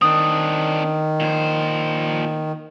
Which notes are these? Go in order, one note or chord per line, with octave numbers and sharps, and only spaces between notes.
D#3 C4 D4 D#6
A#2 C5